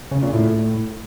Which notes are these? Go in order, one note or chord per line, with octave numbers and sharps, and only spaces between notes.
C#3
A#2
A2